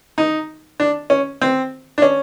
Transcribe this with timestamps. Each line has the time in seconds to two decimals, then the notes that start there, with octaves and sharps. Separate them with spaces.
0.18 D#4
0.80 D4
1.10 C#4
1.42 C4
1.98 D4
2.02 C#4